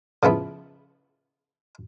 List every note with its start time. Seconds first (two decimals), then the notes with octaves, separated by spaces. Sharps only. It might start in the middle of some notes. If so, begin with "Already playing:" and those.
0.23 C#3 F3 B3 E4